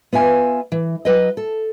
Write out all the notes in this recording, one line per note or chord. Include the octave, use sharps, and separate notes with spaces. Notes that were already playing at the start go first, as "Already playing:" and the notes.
B3 F4 E5 G#5
E3
F#3 B4 D#5
A4